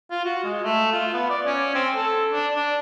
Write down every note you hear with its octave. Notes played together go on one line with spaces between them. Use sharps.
F4
F#4
G#3
A3
F4
B3
D5
C#4
C4
A4
D4
D4